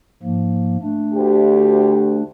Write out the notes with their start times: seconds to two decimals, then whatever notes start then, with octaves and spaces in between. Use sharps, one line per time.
0.23 G#2 F3 A#3
0.82 A3 D4
1.13 D2 G4